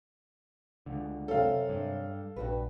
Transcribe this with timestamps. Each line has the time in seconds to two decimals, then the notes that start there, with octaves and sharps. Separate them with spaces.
0.86 C#2 D3
1.28 F#2 C3 A4 F5
1.69 G2
2.36 A#1 G2 F#4 B4